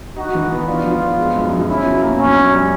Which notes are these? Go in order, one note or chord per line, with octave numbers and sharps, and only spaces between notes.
D#4 F#4
E3
B3
D4 F4
F3
B3
G#3
F#2
F3
C#4 E4
B2
A#3
F#2 C#4
F#2
G3